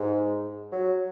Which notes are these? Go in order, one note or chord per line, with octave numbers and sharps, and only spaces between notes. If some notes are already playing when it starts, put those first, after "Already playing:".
Already playing: G#2
F#3